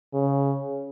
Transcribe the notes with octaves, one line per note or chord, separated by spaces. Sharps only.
C#3